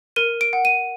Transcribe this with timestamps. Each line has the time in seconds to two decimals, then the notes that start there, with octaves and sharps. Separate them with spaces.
0.16 A#4 D#7
0.41 D7
0.53 F#5
0.65 D#7